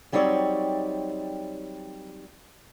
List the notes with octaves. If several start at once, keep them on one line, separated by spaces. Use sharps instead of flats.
F#3 G3 C4 D#4 C#5 D5